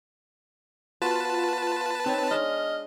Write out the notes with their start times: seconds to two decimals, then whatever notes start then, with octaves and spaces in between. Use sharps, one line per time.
1.02 B3 F4 F#4 B4 C5 A5
2.06 C4 D#4 C#5
2.31 G#3 D4 D#5 F6